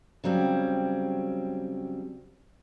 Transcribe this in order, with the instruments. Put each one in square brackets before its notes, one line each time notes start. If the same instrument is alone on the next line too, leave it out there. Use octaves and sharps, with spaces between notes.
[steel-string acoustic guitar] C#3 F#3 G3 C4